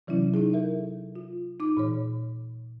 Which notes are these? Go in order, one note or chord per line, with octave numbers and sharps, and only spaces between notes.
C3 E3 F#3 C#4 E4
D#4 E4 G#4
A4 A#4 E5
F4
D#4 D6
A#2 E3 C#5